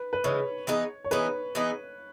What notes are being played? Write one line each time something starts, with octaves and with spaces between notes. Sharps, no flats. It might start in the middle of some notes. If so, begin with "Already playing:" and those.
Already playing: B4
B4
C#3 E3 G#3 C#5
E3 B3 D#4 G#4
C#5
E3 B3 D#4 G#4 B4
E3 B3 D#4 G#4